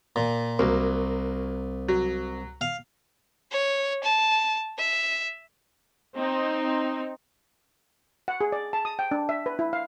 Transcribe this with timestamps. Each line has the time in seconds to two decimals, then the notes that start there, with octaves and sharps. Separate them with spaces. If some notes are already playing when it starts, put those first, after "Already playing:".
0.16 A#2
0.59 C2 F#3 A#3
1.88 F#3
2.61 F5
3.52 C#5
4.03 A5
4.78 E5
6.16 C4 D#4
8.28 F#5
8.41 G#4
8.52 D5
8.73 A5
8.85 D#6
8.99 G5
9.11 D4
9.29 E5
9.46 B4
9.59 E4
9.73 F5